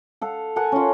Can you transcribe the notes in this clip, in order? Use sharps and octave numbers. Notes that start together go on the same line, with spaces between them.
A4 F5 F#5
A4 A#4 F#5 G#5
C#4 F4